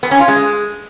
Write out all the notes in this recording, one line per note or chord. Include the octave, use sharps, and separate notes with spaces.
B3
C#4
F4
G#3